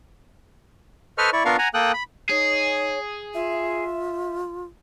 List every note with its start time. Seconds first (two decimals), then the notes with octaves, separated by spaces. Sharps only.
1.18 A4 B4 C5 D#5 C#6 F6
1.33 E4 D5 C#6
1.45 B3 D4 F4 A#4 F5 C#6
1.59 F#5 G#5 A#5
1.74 A#3 A4 G5 D#6 F#6
1.94 B5
2.29 D#4 G#4 C#5
3.34 F4 E5